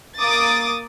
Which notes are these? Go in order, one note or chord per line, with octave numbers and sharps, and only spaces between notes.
A#3 D6 D#6 A6